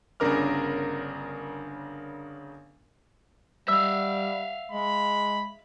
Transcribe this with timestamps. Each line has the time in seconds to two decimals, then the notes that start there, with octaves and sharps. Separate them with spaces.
0.20 G1 C#3 D4 A#4 D6 F6
3.68 G3 E5 F5 E6
4.72 G#3 B5